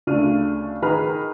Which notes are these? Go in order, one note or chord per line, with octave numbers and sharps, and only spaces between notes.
D2 C#3 A3 D4 F6 D#7
D#3 G#4 B4 A#5 B5 F6